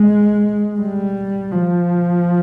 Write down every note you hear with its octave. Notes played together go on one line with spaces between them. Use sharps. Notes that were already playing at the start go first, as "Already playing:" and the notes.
Already playing: G#3
G3
F3